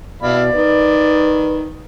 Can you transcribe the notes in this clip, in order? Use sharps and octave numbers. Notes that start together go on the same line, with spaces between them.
B2 E4 D5 F5 B5
D#3 B4